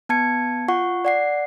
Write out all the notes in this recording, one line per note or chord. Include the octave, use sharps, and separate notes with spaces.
B3 A5 G#6 C#7
F4 F#5 C#6
D5 F#5 C7